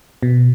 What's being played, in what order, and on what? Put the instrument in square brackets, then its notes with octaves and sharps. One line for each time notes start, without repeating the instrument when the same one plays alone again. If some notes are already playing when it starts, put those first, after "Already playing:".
[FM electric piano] B2